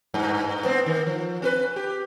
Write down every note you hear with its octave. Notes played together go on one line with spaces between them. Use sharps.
G2
B3 C4
D#3
F3
C4 A#4 B4
G4